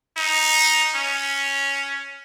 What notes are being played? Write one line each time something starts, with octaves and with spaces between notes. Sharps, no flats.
D#4
C#4